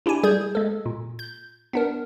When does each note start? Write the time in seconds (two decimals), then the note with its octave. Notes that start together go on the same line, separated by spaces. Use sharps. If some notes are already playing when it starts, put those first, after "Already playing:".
0.06 D4 E4 G4 G#5
0.23 G3 G#4 G6 G#6
0.55 G#3 A4
0.86 A#2
1.19 G6
1.73 B3 D4 A#4